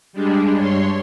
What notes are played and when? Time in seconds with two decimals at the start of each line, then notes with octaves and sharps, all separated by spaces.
0.13 G3 G#3 D4
0.56 G2 C#5 C6